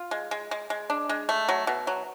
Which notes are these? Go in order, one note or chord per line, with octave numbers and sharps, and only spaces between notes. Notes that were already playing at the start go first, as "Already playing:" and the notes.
Already playing: F4
G#3
G#3
G#3
G#3
D4
G#3
A3
F#3
B2
F#3